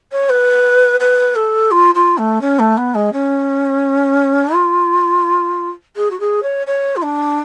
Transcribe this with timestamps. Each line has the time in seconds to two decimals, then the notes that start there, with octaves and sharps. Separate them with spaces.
0.11 C#5
0.29 B4
1.00 B4
1.35 A4
1.71 F4
1.94 F4
2.17 A3
2.41 C#4
2.59 A3
2.77 B3
2.94 G#3
3.12 C#4
4.54 F4
5.96 G#4
6.10 F#4
6.19 G#4
6.42 C#5
6.66 C#5
6.96 F4
7.02 D4